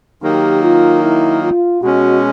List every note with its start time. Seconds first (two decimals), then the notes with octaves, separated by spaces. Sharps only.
0.22 D#3 F#3 A#3 D#4 G4
0.62 F4
1.02 E4
1.42 F4
1.82 B2 G#3 C#4 F#4